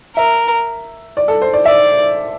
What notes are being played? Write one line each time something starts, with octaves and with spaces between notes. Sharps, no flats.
A#4 E5
D5
A4
C5
D5
D5 E5